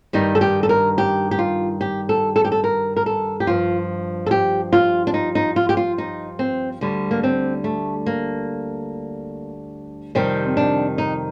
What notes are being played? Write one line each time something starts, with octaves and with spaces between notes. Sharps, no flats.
G2 D#3 G3 D#4
A4
G4
A4
A#4
G4
G4
F4
G4
A4
A4
G4
A4
A#4
A#4
A4
G4
G2 F3 F4
A4
G4
F4
D4
D#4
D#4
F4
G4
F4
D#4
C4
D2 D3 G3
A#3
C4
A3
A#3
F2 C3 D#3 G3 C4
D4
D#4